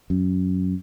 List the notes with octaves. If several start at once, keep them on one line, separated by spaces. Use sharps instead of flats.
F#2